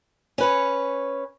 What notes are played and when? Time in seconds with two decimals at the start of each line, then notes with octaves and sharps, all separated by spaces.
0.38 C#4 B4 C#5